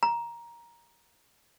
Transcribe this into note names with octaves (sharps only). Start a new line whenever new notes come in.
A#5